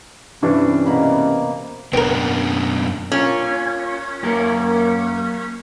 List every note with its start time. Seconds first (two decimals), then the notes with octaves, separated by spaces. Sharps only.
0.42 G2 C3 E3 C#4 D4
0.85 B2 A#3 B5
1.93 F#2 B2 C4 D4 A#4
3.12 C#4 F4 A#4
4.23 F#2 A#3 G4 A#4